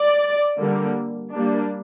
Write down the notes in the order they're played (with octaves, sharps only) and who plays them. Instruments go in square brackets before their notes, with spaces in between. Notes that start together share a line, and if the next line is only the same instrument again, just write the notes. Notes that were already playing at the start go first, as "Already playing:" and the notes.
Already playing: [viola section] D5
D3 G3 A#3
G3 A#3 D4